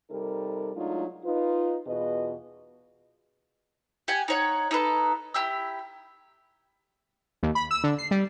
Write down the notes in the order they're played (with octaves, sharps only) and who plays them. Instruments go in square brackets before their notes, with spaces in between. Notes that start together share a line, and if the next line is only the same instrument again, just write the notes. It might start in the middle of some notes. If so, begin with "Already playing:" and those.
[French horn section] C3 G3 D#4 A4 A#4
F#3 G#3 A3 D4 D#4 F4
D#4 F4 B4
E2 B2 F4 G#4 B4 D#5
[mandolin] G4 F#5 G#5
D#4 C#5 F#5
D#4 A4 B4
E4 G4 E6
[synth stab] D#2
B5
E6
D3
C7
G3